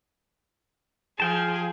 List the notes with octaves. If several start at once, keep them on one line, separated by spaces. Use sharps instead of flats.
F3 G#4 F5 G5 A5